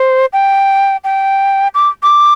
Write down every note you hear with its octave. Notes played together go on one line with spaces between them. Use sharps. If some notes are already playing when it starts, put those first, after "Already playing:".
Already playing: C5
G5
G5
D6
D6